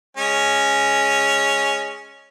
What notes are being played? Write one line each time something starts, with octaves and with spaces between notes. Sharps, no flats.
G#3 C#4